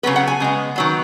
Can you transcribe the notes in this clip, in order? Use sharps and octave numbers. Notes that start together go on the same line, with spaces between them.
C#3 F#3 B3 B4
F#5
G#5
C#3 G#3 B3
D#3 F#3 B3